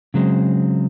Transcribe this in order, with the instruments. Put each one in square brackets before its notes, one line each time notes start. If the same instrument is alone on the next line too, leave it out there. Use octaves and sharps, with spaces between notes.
[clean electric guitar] C#3 F#3 G#3 C4